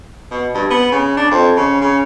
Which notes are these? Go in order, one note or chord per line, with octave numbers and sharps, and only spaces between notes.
B2
G2
B3
C#3
D4
F2
C#3
C#3